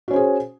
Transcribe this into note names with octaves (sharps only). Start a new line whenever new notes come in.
C#4 F#4 G#4 C5